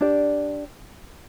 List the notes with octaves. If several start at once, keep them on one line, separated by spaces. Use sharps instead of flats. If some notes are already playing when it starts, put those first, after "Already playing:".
D4 G4 D5